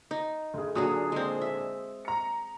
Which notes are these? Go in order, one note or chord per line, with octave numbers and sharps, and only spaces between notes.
D#4
D2 G#4
A#2 D3 F#3 F#4 G#4 D#6
G#3 C4
E5
A#5 C#7